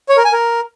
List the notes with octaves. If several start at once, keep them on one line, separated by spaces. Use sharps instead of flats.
C#5
A#4
G#5
A#4